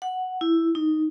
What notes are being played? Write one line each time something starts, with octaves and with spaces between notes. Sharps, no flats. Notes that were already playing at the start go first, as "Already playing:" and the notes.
F#5
E4
D#4